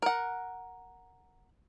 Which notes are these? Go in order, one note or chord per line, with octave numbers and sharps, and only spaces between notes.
A#4 F#5